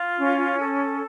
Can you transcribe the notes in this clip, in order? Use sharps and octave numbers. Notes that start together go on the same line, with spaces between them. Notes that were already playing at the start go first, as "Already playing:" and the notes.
Already playing: F4
C#4
A4